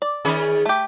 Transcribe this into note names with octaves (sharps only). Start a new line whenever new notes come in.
D5
D#3 C#4 G#4
A3 G4